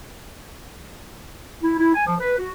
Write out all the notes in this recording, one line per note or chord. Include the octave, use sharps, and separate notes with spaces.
E4
E4
G#5
F3
B4
F#4